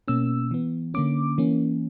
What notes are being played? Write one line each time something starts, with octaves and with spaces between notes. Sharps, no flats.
B2 A#3 C#4 E6
E3 B3
D3 A#3 C#4 D6
E3 A#3 C#4